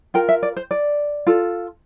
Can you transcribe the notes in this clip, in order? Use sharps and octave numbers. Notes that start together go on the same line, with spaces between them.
F4 A#4 G5
E5
D5
C5
D5
F4 A4